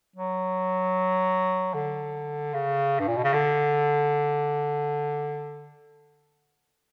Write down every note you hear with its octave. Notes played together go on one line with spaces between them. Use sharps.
F#3
D3
C#3
G2
A#2
B2
C#3
D3